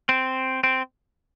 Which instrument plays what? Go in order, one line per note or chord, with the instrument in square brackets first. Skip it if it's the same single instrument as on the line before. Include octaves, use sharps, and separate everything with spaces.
[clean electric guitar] C4
C4